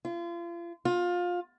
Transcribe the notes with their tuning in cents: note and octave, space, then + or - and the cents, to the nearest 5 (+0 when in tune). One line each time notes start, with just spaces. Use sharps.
F4 -35
F4 +20